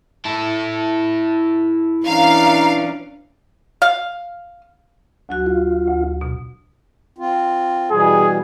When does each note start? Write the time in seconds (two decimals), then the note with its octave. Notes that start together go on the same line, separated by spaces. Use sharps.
0.25 E4 A4
2.06 E3 C#4 D4 F5 A#5
3.82 F5
5.29 D2 F#3 F#4
5.46 F4
5.87 D2
6.21 B2
7.18 C4 F4
7.91 B2 E3 G3 G#4